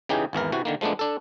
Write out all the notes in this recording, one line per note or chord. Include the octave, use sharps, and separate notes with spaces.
C#3 E3 D#4 G4 G#4
G#1 E2 E3 A#4
C3 E3 F#4
D3 D#3 A#3
F3 G#3 A3 B3 D4
D4 A4